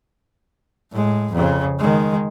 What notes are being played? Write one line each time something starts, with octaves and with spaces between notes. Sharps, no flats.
A2 G#3
F2 C#3
D#3 G#3